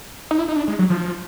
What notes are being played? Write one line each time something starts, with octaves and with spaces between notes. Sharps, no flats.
D#4
E4
D#4
D4
G#3
F#3
F3